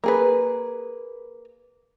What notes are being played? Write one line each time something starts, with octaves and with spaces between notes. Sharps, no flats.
A#3 G#4 B4